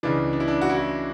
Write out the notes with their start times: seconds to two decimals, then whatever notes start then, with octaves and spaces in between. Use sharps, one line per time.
0.03 C#2 C#3 E3 D4
0.33 D4
0.40 E4
0.48 D4
0.62 F#4
0.69 E4
0.77 F#4